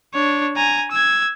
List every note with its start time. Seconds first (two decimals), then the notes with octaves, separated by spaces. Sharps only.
0.14 D4 C#5
0.56 G#5 A#5
0.91 E6 G#6